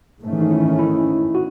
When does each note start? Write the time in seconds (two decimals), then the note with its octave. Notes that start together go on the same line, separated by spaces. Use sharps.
0.23 G#2 D#3 A3 C#4
0.33 E3
0.42 D#4
0.51 E4
0.79 E4
1.35 F#4